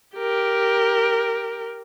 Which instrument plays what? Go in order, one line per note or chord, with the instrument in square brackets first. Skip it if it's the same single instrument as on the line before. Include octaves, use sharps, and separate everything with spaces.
[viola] G4 A#4